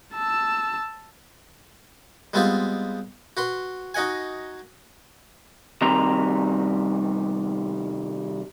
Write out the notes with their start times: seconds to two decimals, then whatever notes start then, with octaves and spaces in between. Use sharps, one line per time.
0.14 A5 E6
2.34 G3 G#3 B3 C4 F4 G4
3.37 F#4 B4 C6
3.94 D#4 F#4 D#5 F#5 G#5
5.81 C2 D#3 G3 C4 A#5